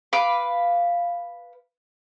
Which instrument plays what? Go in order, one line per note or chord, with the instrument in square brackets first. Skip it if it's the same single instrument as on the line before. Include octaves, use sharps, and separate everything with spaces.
[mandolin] B4 F5 D6